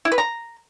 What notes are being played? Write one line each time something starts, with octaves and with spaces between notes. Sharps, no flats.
E4
B4
A#5